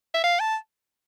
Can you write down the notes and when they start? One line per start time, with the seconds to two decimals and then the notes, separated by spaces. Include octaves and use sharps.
0.14 E5
0.24 F5
0.40 A5